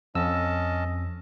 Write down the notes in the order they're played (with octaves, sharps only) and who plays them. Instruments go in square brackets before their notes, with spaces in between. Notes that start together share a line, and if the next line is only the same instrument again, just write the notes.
[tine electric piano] F2 E6 [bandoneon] C#4 D#5 A5